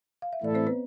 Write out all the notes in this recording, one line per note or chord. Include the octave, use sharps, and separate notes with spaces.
F5
E5
A2 E3 A3 E4 A4 D5
C4 C5
B3 B4